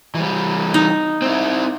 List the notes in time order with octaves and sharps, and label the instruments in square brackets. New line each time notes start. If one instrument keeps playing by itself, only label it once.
[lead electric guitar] E3 G3
[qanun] D#4
[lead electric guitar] C4 E4